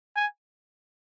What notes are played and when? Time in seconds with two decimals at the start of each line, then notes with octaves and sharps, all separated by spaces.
0.16 G#5